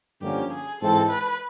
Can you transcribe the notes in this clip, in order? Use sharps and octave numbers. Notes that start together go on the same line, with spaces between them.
G2 D3 F3 A#3 C#4 G4
G#4
G#2 E3 G#3 C4 A4
B4